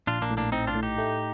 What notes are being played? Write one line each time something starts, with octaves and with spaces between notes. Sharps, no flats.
A#1 D4 F4
A#3 D4
A2
A#3 D4
A2 C4 D#4
D4 F4
A2
D#4 G4
A3